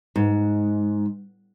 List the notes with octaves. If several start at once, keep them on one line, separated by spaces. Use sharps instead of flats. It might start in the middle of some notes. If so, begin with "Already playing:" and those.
G#2